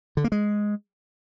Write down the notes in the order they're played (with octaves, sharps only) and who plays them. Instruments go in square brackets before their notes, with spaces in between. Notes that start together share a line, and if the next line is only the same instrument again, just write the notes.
[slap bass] D3
A#3
G#3